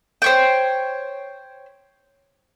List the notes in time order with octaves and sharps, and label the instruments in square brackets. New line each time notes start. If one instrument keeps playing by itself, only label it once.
[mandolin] C5 C#5 G5